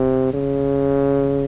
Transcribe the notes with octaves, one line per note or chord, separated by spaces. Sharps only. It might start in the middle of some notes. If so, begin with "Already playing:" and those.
Already playing: C3
C#3